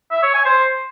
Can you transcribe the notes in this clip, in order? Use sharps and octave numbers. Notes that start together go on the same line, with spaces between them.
E5
C#5
G#5
C5